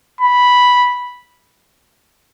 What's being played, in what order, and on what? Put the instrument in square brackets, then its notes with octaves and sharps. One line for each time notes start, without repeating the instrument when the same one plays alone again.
[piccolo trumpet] B5